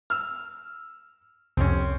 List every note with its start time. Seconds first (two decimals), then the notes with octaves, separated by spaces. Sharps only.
0.10 E6 F6
1.57 C2 F2 C4 C#4